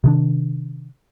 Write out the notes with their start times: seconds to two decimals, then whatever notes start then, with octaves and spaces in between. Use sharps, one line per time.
0.04 C3 D#3 D4